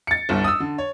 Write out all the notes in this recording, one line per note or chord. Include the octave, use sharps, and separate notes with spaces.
A6 C#7
G1 C2
D#6 E6
D3
C#5